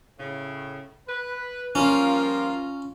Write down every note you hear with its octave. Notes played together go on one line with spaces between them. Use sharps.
A2 C#3
B4
F3 G3 A#3 C#4 F4 A#5